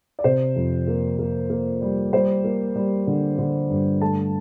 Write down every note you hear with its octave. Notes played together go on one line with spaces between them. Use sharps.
D5
C3 C5
F2
A#3
A#3
A#3
G3
G3 C5
A#3
G3
D3
D3
G2
A3 A5